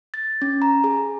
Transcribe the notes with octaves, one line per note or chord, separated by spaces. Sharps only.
A6
C#4
A#5
G#4